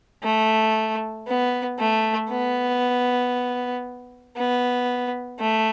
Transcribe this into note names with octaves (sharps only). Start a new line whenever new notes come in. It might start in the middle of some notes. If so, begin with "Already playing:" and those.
A3
B3
A3
B3
B3
A3